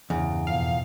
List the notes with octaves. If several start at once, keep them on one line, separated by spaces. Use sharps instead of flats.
E2 G2 C#3
F2 B2 F5